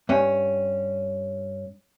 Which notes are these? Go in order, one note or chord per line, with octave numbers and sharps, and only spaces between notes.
G2 C#4